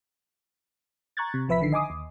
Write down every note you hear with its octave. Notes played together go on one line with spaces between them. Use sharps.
A#5 C#6 F#6 G#6 A6
C3
A1 F3 B4 E5 B5 B6
A1 D3 D#3 C7
D#5 G#5 D6 D#6
D#2